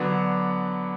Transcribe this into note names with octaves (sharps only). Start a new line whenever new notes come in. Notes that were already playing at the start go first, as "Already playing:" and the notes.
Already playing: D3 F#3 B3 D4